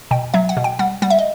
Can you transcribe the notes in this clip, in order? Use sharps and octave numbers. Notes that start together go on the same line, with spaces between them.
B2 G5
F#3 E5
F#5
B2
G5
G3 F#5
G3 F#5
E5
D#5